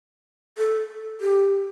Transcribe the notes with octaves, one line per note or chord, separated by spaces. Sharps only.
A4
G4